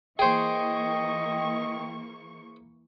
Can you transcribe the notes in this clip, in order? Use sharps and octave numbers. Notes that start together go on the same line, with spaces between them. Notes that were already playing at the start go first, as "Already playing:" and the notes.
E3 A#3 G#4 C5 D#5 G5 C#6